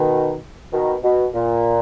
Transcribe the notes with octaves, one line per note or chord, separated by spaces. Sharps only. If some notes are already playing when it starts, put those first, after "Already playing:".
Already playing: B2 D#3
B2 D#3
B2
A#2